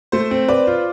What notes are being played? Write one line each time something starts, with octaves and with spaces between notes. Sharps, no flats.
A3 C5
C4
B4 D5
F4